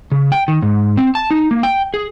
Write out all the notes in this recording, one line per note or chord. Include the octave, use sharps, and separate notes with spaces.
C#3
G5
D#3
G#2
C4
A5
D#4
A#3
G5
G#4